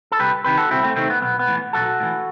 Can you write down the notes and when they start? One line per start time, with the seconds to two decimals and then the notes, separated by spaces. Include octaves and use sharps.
0.12 A4
0.19 C2 G4 B4
0.44 C3 D#3 G4 B4
0.58 F#4 A4
0.71 C2 C4 E4
0.83 A3 C4
0.96 C3 D#3 A3 C4
1.10 B3
1.22 B1 B3
1.39 B3
1.48 A2 E3
1.73 B1 F#4 A4
2.00 A2 E3